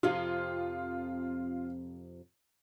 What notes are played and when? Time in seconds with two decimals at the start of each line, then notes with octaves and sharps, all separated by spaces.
0.03 F2 C3 F3 F4